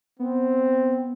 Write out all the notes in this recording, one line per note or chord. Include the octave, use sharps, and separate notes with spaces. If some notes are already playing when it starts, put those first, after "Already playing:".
B3 C4